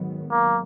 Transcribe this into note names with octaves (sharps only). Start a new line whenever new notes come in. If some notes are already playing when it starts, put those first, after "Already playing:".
Already playing: G#2 D#3 F#3 B3
A#3